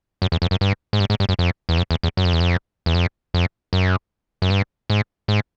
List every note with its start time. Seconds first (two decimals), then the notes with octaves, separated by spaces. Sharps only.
0.22 F#2
0.32 E2
0.42 F2
0.51 F#2
0.61 G2
0.93 G#2
1.00 G2
1.10 G#2
1.20 G2
1.29 F#2
1.39 F2
1.69 E2
1.78 F2
1.91 E2
2.03 E2
2.17 F#2
2.25 F2
2.33 E2
2.41 F2
2.86 E2
2.95 F2
3.34 F2
3.73 F#2
4.42 F#2
4.50 G2
4.90 G#2
5.28 G#2